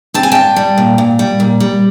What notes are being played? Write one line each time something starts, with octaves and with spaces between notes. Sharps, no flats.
C4 A5
G#5
A#2 G5 A5
G3
A#2
A#2
G3
A#2
G3